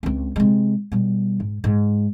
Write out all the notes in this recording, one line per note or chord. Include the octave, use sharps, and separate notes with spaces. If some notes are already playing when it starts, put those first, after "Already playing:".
C#2 C4
C3 G#3
B2 G3
G#2
G#2